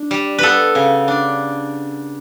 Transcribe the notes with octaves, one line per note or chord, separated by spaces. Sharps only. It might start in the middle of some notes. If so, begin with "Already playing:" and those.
Already playing: D4
G3
B3 A4 B4
C#3
D4